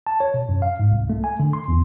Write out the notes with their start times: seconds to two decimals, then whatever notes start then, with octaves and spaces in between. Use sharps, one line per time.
0.07 A5
0.20 C#5
0.34 B2
0.49 F#2
0.62 F5
0.79 G#2
0.92 C2
1.10 A3
1.24 G#5
1.40 D3
1.53 C6
1.68 E2